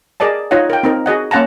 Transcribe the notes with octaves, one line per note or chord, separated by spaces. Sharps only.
G#4 A#4 D5 D#5 A5
D#4 F4 C#5 D#5 F#5
A#4 G5
C4 D#4 A#4
F#4 G#4 D#5 F#5
A#3 C#4 F#5 A5 A#5